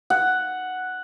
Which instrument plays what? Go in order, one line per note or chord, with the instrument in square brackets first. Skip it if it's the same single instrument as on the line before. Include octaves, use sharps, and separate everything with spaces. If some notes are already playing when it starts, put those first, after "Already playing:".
[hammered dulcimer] F#5